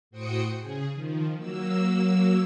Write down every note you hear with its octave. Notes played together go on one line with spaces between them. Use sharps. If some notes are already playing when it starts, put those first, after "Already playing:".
A2 F#4 C5 G5 D#6 C#7
C#3 G#4
D#3 F3
F#3 A#3 E6